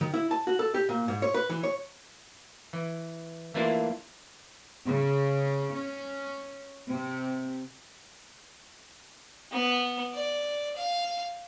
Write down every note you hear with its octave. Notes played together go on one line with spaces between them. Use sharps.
D#3
E4
A5
F#4
A4
G4
A#2
G#2
C#5
B4
E3
C#5
E3
E3 A3 A#3 D4 E4 F4
C#3
C#4
C3
B3
D5
F5